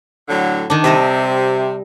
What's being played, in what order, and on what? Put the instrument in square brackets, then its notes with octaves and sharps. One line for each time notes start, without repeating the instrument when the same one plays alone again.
[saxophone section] A2 D3 F#3
[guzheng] D#3 D4
[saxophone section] C3 [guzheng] G3 D#5 E5